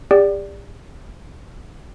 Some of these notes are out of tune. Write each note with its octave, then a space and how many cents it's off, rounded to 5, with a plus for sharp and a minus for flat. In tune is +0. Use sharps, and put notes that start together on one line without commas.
G4 +40 D5 +0 G5 -40